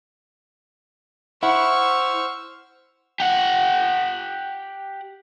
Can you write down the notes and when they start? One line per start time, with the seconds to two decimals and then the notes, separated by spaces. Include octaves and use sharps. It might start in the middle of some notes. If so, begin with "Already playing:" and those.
1.43 E4 C5 F#5 C#6 E6 F6
3.20 G4 F#5